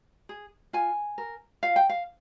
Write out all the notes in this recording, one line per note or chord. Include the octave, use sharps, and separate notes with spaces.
G#4
F4 G#5
A#4
F4 F5
G5
F5